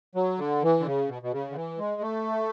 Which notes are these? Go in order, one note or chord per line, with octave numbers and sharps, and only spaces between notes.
F#3
D3
E3
D3
C#3
B2
B2
C#3
D3
E3
G#3
A3